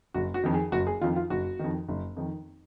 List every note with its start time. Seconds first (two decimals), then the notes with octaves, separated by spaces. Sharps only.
0.14 F#1 F#4
0.34 F#4
0.44 F2 D#3
0.54 G#4
0.72 F#1 F#4
0.87 G#4
1.01 F2 D#3 F4
1.16 F4
1.30 F#1 F#4
1.59 F2 D#3
1.89 F#1
2.16 F2 D#3